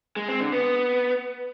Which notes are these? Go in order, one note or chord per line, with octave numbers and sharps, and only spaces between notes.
G#3
C4
D3
B3